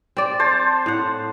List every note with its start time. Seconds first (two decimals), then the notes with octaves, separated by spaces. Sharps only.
0.17 C4 D5
0.39 C5 A5
0.86 A2 F#5